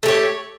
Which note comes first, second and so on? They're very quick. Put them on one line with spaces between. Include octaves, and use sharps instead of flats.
A3 G4 C#5